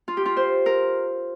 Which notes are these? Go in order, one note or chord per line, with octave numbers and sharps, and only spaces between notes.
F4
G4
F4
C5
A#4